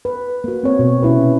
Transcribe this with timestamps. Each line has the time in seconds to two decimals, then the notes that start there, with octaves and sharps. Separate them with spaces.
0.05 B4
0.44 A#3 F#4
0.64 C4 C#5
0.79 B2
1.03 C3 C#4 E4 B4